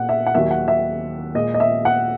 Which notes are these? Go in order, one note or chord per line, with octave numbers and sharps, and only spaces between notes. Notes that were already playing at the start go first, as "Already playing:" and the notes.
Already playing: A#2 F#5
E5
F#5
D#2 D#3 F#3 A#3 E5
F#5
E5
A#2 G#3 D#5
D#5
E5
F#5